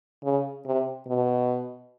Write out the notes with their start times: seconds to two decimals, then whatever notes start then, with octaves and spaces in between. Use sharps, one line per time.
0.24 C#3
0.65 C3
1.07 B2